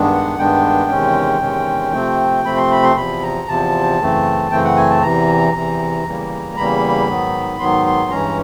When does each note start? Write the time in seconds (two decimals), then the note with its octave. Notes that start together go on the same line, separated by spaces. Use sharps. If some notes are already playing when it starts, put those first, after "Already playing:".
Already playing: G2 D#3 G#3 B3 D4
0.14 F#5
0.38 G2 D#3 G#3 B3 D4 G5
0.90 E2 C3 D#3 G#3 C#4
1.41 E2 C3 D#3 G#3 C#4
1.93 C3 F3 A3 C4
2.44 C3 F3 A3 C4 B5
2.57 C6
2.71 B5
2.83 C6
2.96 E2 C3 F3 B5
3.23 A#5
3.48 E2 C3 F3 A5
3.99 F#2 C#3 E3 A3 C4
4.51 F#2 C#3 E3 A3 C4 G5
4.64 F#5
4.76 G#5
4.90 A5
5.02 E2 C3 E3 A#5
5.53 E2 C3 E3
6.05 E2 C#3 E3 G3 A#3
6.57 E2 C#3 E3 G3 A#3 B5
7.08 G#2 D#3 F#3 B3
7.59 G#2 D#3 F#3 B3 C6
7.85 C6
8.11 G2 E3 G#3 C#4 A#5